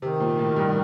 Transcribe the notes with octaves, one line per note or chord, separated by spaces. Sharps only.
C3 D#3
A#2
A2
G2